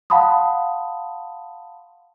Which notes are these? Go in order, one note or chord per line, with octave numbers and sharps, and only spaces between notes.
F5 F#5 A5 B5 C6 D#6